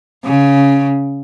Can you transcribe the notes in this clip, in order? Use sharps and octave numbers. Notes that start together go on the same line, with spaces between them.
C#3